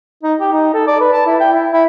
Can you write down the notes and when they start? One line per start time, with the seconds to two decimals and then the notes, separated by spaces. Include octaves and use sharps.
0.23 D#4
0.40 G4
0.53 D#4
0.74 A4
0.87 D5
1.01 B4
1.13 A5
1.26 E4
1.40 G5
1.52 E4
1.72 E4